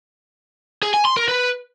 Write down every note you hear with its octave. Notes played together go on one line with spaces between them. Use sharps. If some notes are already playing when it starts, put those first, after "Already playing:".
G#4
G#5
C6
A#4
B4